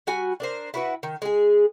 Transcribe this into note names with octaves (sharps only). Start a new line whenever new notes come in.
G3 F#4 G#5
D4 A#4 C5
E4 F#4 B4
D#3
G#3 G#4